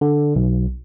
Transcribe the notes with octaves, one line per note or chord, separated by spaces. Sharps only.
D3
B1